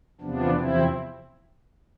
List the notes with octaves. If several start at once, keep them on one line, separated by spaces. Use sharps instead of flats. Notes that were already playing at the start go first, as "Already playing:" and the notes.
E2 C3 F3 B3 D4
E2 C3 F3 C4 E4